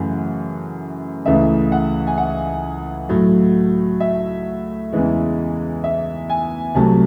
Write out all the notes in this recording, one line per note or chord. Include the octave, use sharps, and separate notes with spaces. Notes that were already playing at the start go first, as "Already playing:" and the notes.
Already playing: F#2 C#3 E3 A3 F#5
C#2 C#3 E3 A3 E5
F#5
G#5
F#5
A2 F#3 A3
E5
E2 C#3 E3 G#3
E5
G#5
C2 C3 F#3 A3 A5